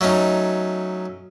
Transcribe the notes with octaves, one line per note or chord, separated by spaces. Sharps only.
F#3 A3 C#4 D#4